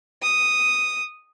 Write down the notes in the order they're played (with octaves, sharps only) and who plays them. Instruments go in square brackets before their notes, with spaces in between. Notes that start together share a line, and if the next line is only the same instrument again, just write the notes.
[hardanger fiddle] D#6